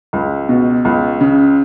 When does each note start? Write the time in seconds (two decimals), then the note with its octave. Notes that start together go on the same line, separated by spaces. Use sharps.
0.13 C#2
0.49 B2
0.85 C#2
1.21 C#3